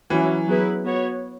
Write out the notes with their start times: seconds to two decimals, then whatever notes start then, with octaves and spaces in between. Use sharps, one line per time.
0.10 E3 F#3 C#4 E4
0.48 F#3 B3 E4 G#4 B4
0.84 B3 F#4 C#5